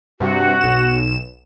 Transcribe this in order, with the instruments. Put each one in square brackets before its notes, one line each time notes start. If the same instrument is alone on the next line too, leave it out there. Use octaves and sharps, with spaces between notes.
[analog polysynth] G2 C3 [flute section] F#4
[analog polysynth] B1 E7